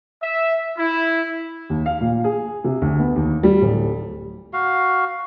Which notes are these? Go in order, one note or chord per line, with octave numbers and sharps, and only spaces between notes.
E5
E4
D#2
F5
A#2
G#4
C3
D2
B3
D#2
G3
D1
F#4 F5